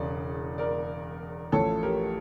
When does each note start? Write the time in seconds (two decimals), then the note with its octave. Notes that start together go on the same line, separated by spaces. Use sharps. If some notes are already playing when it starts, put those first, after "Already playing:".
Already playing: E1 E2 C#3 D5
0.58 A#4 D5
1.52 A1 A2 F3 A4 C#5
1.83 G4 A#4